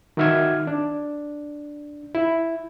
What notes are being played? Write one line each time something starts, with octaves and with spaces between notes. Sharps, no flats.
D#3 F#4 E5 F6 G#6
D4
E4